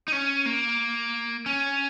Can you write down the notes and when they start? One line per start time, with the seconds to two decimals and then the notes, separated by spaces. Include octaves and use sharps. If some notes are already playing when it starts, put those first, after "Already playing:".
0.08 D#4
0.12 C#4
0.46 A#3
1.46 C#4